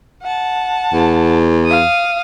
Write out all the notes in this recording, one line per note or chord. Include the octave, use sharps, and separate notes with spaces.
F#5 A5
E2
F5 D#6